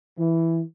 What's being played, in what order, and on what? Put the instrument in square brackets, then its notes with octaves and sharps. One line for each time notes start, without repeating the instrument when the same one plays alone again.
[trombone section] E3